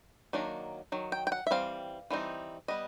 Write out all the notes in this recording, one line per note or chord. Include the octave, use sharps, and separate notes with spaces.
D#3 F#3 A#3 D4
D#3 F#3
G5
G5
F#5
E5
E3 G3 C4 F5
E3 G3 C4 D#4
G3 B3 D#5